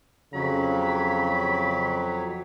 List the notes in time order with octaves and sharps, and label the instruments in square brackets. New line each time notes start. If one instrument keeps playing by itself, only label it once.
[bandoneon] F2 F#3 [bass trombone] C#3 [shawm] B5